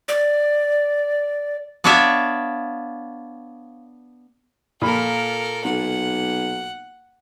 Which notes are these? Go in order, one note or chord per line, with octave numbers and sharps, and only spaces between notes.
D5
B3 D4 C#5 D5 E5 F5
A#2 F4 A4 A#4 B5
B1 F#5